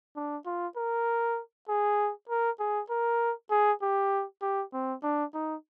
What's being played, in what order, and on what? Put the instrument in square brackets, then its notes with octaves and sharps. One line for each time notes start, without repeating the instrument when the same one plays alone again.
[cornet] D4
F4
A#4
G#4
A#4
G#4
A#4
G#4
G4
G4
C4
D4
D#4